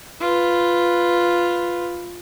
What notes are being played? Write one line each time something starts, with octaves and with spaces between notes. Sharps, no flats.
F4 B4